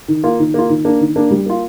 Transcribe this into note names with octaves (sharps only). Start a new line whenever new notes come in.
D#3
A#3 F4
D#3
A#3 F4
D#3
A#3 D4
D#3
A#3 D4
G3
A#3 F4